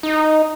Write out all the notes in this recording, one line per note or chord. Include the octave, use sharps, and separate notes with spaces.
D#4